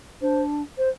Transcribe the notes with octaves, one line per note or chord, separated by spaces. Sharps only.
D4 C5
C5